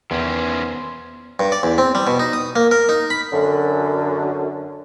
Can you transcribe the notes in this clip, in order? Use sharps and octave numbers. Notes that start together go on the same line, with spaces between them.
E2 D#3 E3 B3 C#4 C5 G5
G2
D5
E2
C4
G3
B2
D#4
D#6
A#3
A#4
D#4
B5
F#2 D3